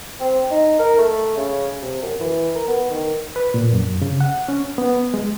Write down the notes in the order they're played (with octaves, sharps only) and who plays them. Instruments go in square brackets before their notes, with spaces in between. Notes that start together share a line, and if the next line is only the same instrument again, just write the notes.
[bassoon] C4
D#4
A#4
A3
C#3
C3
F#2
E3
A#4
B3
D#3
[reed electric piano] B4
A#2
F#2
C#3
F#5
C#4
B3
G#3